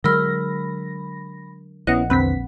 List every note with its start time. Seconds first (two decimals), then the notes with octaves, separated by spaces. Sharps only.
0.04 D3 F#3 G#3 A#4 B5 E6 F6 A#6
1.87 A#1 B3 C#4 E4 D#5 F#5 F#6
2.10 E2 D3 C4 B4 B6